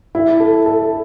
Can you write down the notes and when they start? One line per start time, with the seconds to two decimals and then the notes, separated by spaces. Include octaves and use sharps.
0.15 E4
0.40 A4
0.66 A4